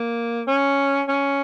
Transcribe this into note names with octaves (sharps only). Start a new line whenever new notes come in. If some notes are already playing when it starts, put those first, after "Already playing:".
Already playing: A#3
C#4
C#4